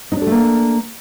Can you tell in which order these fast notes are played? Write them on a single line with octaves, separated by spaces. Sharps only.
D#4 D4 A4 A3 A#3